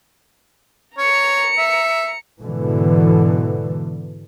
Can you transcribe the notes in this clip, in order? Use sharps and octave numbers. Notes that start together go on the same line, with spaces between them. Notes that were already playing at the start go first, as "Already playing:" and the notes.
C#5 A#5 C#7
E5
G#2 B2 D3 E3